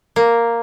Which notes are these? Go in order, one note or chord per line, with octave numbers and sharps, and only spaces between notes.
A#3